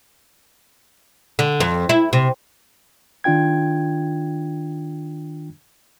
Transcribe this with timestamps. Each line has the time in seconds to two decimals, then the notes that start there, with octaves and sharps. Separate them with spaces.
1.39 D3
1.60 F2
1.89 E4
2.13 C3
3.24 D#3 D4 F4 G5 G#6